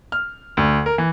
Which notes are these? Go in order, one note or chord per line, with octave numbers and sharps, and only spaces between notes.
F6
D2
A#4
E3